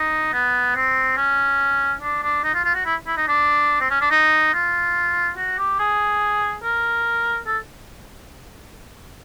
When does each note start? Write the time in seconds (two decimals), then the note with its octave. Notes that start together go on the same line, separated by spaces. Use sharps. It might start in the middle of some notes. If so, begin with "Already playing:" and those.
Already playing: D#4
0.33 B3
0.76 C4
1.17 C#4
2.01 D4
2.23 D4
2.44 D#4
2.54 F4
2.65 F4
2.75 F#4
2.85 E4
3.07 E4
3.17 D#4
3.28 D4
3.80 C4
3.90 C#4
4.01 D4
4.11 D#4
4.54 F4
5.37 F#4
5.58 G4
5.79 G#4
6.63 A#4
7.47 A4